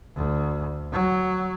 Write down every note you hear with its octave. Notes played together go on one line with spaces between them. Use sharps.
D2
F#3